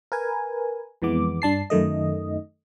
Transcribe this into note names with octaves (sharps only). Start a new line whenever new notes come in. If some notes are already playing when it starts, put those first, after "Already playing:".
A#4 B4 G#5
F2 E3 G#3 B3 D6
G2 D4 A5 C7
F#2 D#3 A3 D#5